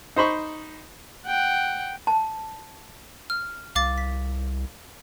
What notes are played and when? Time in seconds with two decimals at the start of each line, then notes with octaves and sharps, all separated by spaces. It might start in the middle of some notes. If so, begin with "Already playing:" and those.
0.16 D#4 C5 B5 C#6
1.26 F#5 G5
2.07 A5
3.30 F6
3.75 C2 F5 D6 A6
3.98 B6